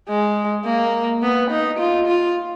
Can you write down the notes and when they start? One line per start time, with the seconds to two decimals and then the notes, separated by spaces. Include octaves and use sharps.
0.09 G#3
0.66 A#3
1.23 B3
1.51 D#4
1.79 F4
2.07 F4